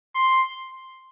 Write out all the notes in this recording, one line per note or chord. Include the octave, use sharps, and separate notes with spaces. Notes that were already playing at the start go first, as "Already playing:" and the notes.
C6